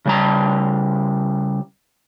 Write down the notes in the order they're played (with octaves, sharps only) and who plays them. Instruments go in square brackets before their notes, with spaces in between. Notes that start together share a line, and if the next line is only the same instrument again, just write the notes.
[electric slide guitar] C#3 G3 A#5